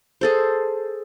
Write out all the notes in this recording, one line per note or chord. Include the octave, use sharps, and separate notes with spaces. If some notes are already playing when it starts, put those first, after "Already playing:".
G#4 A4 C5